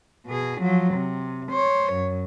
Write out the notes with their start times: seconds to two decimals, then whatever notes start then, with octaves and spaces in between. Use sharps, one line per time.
0.27 B2 G#4
0.62 F3 F#3
0.94 C3
1.51 C5 C#5
1.94 F#2